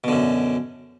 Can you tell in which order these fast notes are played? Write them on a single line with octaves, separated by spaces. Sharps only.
B2 D3 F#2